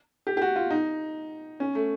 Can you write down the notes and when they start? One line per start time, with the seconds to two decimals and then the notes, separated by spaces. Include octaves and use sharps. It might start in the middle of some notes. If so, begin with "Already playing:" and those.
0.27 G4
0.37 G4
0.42 F#4
0.56 F4
0.70 D#4
1.60 C#4
1.75 A3